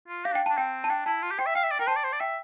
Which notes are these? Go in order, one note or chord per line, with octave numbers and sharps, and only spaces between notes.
F4
G4 F5
D4 G5
A5
D4
C4 G5
A5
D4 G5
E4 A5
F4
G4
C5 G5
E5
F5 G5
E5
D5
A#4 G5
C5 A5
D5
C5
D5
E5 G5